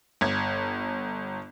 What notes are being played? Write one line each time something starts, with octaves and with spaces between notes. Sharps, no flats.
G1 G#6